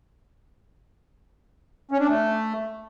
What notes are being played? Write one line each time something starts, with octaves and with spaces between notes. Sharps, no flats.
C#4
D4
A3